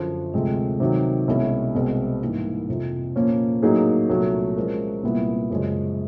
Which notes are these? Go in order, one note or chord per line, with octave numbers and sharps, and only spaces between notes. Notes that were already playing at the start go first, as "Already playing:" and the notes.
Already playing: F#2 D3 F3
D2 C3 F3 G#3 C4
C3 D#3 F#3
C2 B2 G#3 C#4 E4
C2 B2 G#3 C4
G#2 E3 G3 A#3
F2 C3 F3
A#2 F3 A#3 C#4
A2 F#3 A#3 D#4 G#4
C2 A#2 F#3 A3
F3 G#3 C#4 F4 A#4
C2 A#2 G3 B3 E4
F#2 C#3 F3 G#3